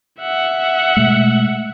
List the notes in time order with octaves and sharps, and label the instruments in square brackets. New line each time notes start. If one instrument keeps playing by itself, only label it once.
[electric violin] E5 F#5
[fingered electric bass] B2 G#3 A3